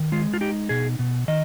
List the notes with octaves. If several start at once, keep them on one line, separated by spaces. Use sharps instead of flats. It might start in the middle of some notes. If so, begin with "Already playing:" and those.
Already playing: D#3
G#3 F4
F4
D#4 G4
B2 G#4
B2
D#3 D#5